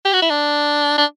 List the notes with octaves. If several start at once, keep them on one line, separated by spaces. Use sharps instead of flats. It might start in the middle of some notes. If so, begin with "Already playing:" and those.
G4
F#4
E4
D4
D4